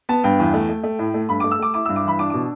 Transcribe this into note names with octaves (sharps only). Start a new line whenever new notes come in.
B3 A5
G2 G5
E2
A3
A3
A3
A2
A3
G2 B5
A3 D6
E6
A3 D6
E4 D6
G2 E6
D6
E3 B5
D4 D6
B2 D6